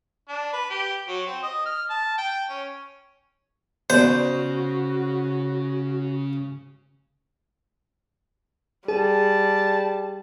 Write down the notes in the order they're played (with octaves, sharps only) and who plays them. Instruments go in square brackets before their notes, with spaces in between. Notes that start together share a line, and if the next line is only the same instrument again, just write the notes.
[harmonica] D4
B4
G4
F#3
C4
D#5
F6
A5
G5
C#4
[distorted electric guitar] C#3 [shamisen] B3 D5 [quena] F#4 [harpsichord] C5
[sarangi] G3 [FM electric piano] G#4 [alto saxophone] A5